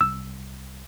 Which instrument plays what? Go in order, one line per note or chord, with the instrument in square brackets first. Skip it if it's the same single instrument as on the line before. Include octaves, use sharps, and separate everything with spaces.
[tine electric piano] C2 [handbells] E6